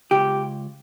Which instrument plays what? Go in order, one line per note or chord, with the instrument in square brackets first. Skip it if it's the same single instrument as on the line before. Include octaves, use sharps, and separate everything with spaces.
[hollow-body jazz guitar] C#2 G4